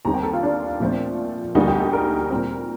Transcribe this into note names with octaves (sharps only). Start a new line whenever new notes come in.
D#2 D#3 G3 C4 A#5
G5
A4
F4
D4
A#2 F3 A3 C4
D2 D3 G3 A#3 D#4
G4
A4
A#4
A#2 G3 C4